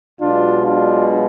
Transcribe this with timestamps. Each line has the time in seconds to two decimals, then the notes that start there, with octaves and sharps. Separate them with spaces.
0.20 B1 B2 G#3 D4 F4
0.66 D4 F4